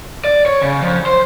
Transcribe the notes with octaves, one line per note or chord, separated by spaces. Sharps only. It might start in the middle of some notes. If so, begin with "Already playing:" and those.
D5
C#5
C#3
F2
C5